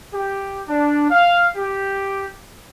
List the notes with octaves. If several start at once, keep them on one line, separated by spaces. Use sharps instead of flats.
G4
D4
F5
G4